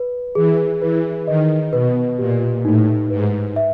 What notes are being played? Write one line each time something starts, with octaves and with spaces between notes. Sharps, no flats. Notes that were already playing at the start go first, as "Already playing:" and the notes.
Already playing: B4
E3 G#4
E3 B4
D#3 D#5
B2 B4
A#2 G4
A2 D#4
G#2 B4
E5